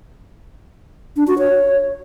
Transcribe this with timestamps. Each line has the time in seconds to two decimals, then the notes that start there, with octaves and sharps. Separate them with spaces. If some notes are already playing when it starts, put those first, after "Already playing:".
1.16 D4
1.27 F#4
1.38 C#5